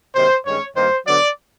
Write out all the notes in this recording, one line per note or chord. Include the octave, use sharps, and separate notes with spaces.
C3 D#3 F#3 A#3 C5
G2 D#3 G#3 C#4 C#5
G2 D#3 G3 A#3 C5
D3 F#3 B3 D5